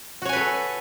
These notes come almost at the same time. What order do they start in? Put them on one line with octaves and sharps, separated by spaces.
F#4 C#5 G#5 B4 A4